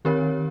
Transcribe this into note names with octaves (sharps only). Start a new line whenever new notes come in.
D#3 C4 G4 A#4 C#5